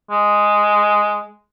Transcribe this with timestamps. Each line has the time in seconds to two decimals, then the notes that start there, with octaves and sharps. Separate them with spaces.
0.11 G#3